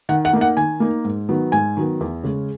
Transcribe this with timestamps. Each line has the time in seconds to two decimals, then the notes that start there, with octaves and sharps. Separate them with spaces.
0.09 D#3 F#5
0.25 F#5
0.33 A#3 D#4
0.41 F#5
0.57 D#3 G#5
0.80 A#3 D#4
1.04 G#2
1.29 D#3 F#3 B3
1.52 G#2 G#5
1.77 D#3 F#3 B3
2.01 E2
2.24 C#3 G#3 C#4